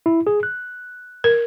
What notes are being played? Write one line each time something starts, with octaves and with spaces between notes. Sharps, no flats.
E4
G#4
F#6
A#4